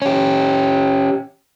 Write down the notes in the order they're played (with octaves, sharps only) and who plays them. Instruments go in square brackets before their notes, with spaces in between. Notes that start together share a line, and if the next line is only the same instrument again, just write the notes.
[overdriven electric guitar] C#4 G4